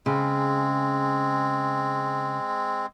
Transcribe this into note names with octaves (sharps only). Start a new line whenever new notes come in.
C#3 G#3 C4